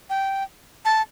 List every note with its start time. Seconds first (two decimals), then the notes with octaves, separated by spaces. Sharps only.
0.10 G5
0.85 A5